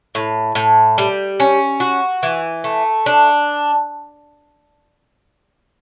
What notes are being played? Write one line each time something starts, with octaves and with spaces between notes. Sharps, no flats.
A2
A2
G3
C#4
F#4
E3
A3
D4